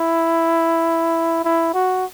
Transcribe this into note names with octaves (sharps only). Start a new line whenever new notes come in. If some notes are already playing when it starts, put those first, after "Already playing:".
Already playing: E4
E4
F#4